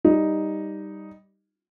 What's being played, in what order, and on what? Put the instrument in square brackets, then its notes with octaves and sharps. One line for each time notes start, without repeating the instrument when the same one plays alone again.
[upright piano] G3 D#4